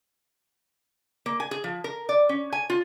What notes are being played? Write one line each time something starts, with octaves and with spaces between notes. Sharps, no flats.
A#3
G#5
G#4
F3
A#4
D5
C#4
G#5
F4